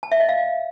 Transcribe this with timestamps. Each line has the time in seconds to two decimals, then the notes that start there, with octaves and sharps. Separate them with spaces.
0.03 A5
0.12 E5
0.20 D#5
0.29 F5